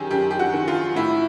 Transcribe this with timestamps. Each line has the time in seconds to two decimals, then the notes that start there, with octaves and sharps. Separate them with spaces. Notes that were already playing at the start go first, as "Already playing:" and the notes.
Already playing: F#2 D#3 G4 G#4
0.11 F#2 G4
0.31 G4
0.39 F#4
0.54 D#3
0.68 F4
0.96 A2 E4